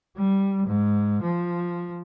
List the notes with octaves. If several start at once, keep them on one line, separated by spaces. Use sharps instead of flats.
G3
G#2
F3